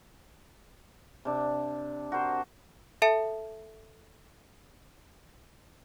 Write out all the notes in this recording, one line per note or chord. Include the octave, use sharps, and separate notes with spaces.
C3 D4
F#4 A#4 C5
A4 E5 A5 C#7